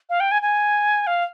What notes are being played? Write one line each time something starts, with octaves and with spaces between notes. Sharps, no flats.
F5
G5
G#5
G#5
F5